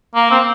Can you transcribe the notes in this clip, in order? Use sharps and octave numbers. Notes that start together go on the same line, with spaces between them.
A#3
C4